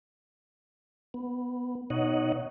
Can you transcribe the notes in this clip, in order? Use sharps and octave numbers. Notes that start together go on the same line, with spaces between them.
B3
B2 D#4 C#5 D#5 F#5